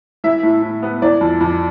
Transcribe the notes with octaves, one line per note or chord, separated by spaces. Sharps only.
E3 E5
A2
A2
B3
E3 D5
F2
F2